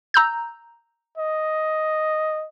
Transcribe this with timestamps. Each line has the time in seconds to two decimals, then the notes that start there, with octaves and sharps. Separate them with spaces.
0.14 A#5 E6 G6
1.18 D#5